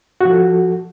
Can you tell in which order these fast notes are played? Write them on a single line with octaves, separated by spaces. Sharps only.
F#4 F3 A4